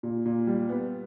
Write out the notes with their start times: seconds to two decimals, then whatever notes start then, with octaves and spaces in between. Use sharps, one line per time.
0.03 A#2
0.25 A#2
0.47 G3
0.69 B3